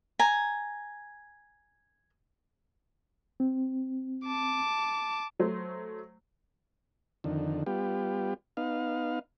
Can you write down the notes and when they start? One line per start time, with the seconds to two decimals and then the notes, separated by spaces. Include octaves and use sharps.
0.19 G#5 A#5
3.40 C4
4.27 A5 D6
5.39 F#3 A3 C5
7.24 F2 D3 D#3
7.66 G3 B3 F4 G4
8.57 B3 D#4 F5